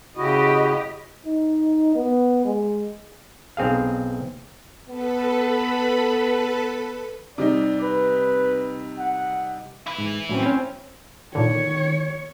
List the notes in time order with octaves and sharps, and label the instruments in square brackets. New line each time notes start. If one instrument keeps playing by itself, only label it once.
[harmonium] C#3 E4 F#4 [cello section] G4 D#5
[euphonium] D#4
B3
G#3
[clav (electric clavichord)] B1 C4 G#4 F5
[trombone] B3 [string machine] A4 B4 B5
[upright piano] C3 G3 D#4 [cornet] D5
[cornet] B4
F#5
[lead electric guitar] E4 B4
[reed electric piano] G#2
[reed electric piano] A2 F#3 C#4 [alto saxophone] C4
[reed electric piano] C#4
[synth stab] A#2 D3 [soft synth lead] D#3 [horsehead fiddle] C#5